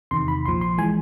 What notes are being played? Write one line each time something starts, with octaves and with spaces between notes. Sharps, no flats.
E2 C3 D#3 C6
B5
A#1 A#2 F3 C6
C6
E3 G#3 G#5